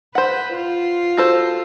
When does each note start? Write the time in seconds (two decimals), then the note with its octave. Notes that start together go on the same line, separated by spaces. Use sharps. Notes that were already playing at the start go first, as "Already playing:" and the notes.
0.15 B4 C5 F#5
0.55 F4
1.17 F#4 A4 C5